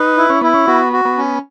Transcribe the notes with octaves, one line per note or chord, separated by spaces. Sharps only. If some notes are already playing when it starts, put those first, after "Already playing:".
Already playing: D#4 B4
E4
C#4
B3 E4
C#4
B3 F#4
F#4
B3
C#4